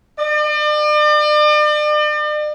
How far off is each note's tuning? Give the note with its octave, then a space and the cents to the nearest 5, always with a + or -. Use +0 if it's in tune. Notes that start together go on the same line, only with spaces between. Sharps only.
D5 +40